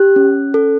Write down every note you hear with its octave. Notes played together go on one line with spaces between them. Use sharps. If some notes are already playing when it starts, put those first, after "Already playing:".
Already playing: G4 F#6
C#4
A4